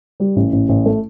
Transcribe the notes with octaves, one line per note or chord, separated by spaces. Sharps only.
G3
A1
A1
A1
A3